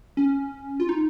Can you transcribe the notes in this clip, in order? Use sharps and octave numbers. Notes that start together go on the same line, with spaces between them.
C#4
F4
D#4